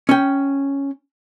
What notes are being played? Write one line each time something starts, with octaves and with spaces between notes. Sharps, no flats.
C#4 G5